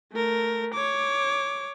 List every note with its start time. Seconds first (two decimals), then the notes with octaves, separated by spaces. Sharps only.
0.13 A3 A#4
0.74 C#5 D6